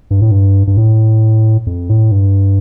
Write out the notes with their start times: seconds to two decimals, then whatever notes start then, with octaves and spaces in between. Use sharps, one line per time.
0.11 G2
0.22 A2
0.31 G2
0.67 G2
0.77 A2
1.67 F2
1.90 A2
2.12 G2